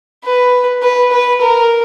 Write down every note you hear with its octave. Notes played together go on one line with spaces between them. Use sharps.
B4
B4
B4
A#4